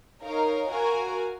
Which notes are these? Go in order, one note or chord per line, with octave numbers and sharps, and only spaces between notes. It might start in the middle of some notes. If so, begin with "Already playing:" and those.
D#4 A#4 C#5 F5
F#4 A#4 F5 G#5